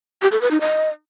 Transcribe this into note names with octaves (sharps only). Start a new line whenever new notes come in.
G4
A4
B4
D#4
D#5